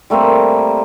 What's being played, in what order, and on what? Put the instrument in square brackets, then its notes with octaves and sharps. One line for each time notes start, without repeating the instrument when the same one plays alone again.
[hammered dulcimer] G3 A3 A#3 C4